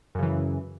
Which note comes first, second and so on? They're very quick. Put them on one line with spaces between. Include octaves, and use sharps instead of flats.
F#2 C#3 E3